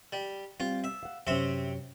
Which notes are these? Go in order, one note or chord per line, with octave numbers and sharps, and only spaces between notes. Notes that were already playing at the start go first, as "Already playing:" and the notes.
G3
G3 C4 F4
E5
F5 F#5
F#2 C3 C4 C#4 E5